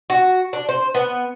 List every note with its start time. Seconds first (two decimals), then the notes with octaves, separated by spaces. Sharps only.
0.10 F#4
0.53 D4
0.69 C5
0.95 B3